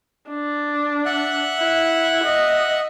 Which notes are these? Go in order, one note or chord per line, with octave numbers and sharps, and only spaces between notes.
D4
E5 F#5 F#6
E4
D#5